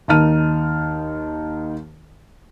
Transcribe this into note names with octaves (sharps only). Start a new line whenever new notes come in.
D#2 D#3 D#4 A5 F6 D#7